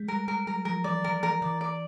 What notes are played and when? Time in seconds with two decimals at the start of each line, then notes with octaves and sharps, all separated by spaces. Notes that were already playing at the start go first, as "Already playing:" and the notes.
Already playing: G#3
0.08 G3 A#4
0.28 G3 A#4
0.47 F#3 A#4
0.65 F3 A#4
0.84 E3 D5
1.04 D#3 A#4
1.23 E3 A#4
1.42 E3 D5
1.61 D5